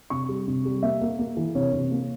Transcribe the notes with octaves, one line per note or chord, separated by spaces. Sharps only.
C3 C#6
G3
C3
G3
A#3 E5
A#3
A#3
E3
C3 C#5
C3
A#3